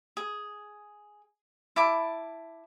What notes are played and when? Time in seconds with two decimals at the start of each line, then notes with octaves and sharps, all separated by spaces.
0.17 G#4
1.76 E4 A5 D6